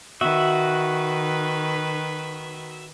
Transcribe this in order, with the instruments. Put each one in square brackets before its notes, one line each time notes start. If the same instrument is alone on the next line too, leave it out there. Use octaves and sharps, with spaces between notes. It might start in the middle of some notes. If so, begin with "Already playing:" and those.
[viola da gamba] D#3 B4 [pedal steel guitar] F#4 E5